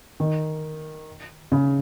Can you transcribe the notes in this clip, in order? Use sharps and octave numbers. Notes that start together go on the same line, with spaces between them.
D#3
C#3